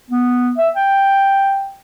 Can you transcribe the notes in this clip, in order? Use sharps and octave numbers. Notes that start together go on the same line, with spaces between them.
B3
E5
G5